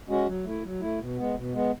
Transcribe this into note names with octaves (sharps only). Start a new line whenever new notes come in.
G#3 C#4 F#4
F#3
A3 E4
F#3
A3 E4
B2
G#3 B3
B2
G#3 B3